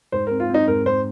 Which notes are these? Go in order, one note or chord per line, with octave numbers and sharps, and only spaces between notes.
G#2 C5
C4 A#4
F4
C4
D#4
G#2 A#4
G#2 C5